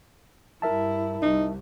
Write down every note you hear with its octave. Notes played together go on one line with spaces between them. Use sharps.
G2 E4 A#4 E5 A5
C2 D#4